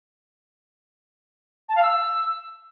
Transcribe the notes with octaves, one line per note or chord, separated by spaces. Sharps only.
A5
F5
E6